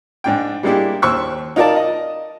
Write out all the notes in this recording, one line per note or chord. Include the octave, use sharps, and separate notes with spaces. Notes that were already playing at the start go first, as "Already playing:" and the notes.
G#2 D4 G5
G3 G#3 A#3 D4 E4 G4
D#2 C5 C#6 E6 F#6
D#4 F4 A#4 D5 A5
D#5